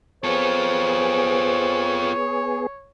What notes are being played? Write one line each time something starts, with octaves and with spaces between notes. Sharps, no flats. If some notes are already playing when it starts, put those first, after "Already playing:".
B3 F4 G#4 A4 C5 C#5